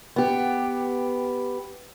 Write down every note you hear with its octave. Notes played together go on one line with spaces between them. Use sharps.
B3 G4